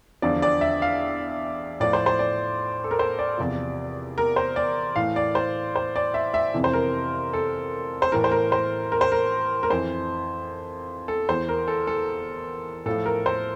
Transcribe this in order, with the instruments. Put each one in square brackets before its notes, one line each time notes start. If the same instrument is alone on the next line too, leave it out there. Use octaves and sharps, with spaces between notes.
[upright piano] E2 D3 F3 D5
D5
E5
F5
A2 F3 D5
C5
C5
D5
A4
A#4
C5
D5
E2 C3 F3
A#4
C5
D5
A2 E3 F5
D5
C5
C5
D5
E5
E5
F2 C3 E3
C5
A#4
A4
C5
A2 E3 A#4
C5
A#4
C5
A#4
C5
A#4
A#4
F2 E3 C5
A4
E2 E3 C5
A#4
A4
A4
A2 F3 A4
A#4
C5